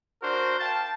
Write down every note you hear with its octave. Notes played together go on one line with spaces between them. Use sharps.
D4 F#4 A#4 C5
F5 G5 A5